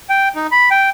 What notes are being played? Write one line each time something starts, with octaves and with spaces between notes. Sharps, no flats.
G5
D#4
B5
G5